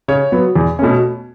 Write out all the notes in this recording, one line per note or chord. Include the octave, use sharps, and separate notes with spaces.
C#3 C#5
F#3 B3
E2
B2 A3 C#4